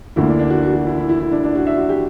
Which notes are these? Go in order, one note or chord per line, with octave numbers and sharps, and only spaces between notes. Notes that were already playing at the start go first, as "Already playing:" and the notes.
D2 D3 A#3 E4
D4
D4
F#4
F#4
F#4
E4
E4
E4
E4
D4
D4
F#4
E5
F#4
G4